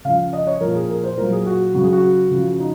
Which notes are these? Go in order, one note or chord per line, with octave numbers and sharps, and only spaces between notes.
C#3 F3 F5
D#5
C#5
A#2 F3 A#4
G#4
A#4
C5
A#2 F#3 A#4
G#4
F#4
C#3 F#3 F#4
G#4
F#4
C#3 F3
D#4